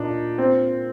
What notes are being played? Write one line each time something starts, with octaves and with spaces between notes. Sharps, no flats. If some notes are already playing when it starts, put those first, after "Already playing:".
Already playing: A#2 D4 D#4
C4